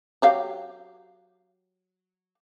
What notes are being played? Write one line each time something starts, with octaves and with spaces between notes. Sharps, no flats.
F#3 G4 F5